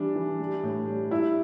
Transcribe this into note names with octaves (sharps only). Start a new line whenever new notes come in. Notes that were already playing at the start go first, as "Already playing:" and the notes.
Already playing: E3 G3 D4
E3
G3
A2
G3
G3 E4